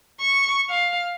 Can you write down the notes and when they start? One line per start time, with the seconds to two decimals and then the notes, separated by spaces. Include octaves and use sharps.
0.20 C#6
0.70 F5